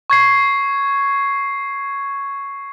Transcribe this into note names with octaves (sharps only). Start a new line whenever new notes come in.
C#6 G#6 C7